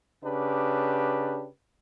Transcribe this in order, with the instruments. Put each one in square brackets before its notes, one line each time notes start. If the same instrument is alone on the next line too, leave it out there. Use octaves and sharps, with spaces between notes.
[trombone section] C#3 D4 G4 B4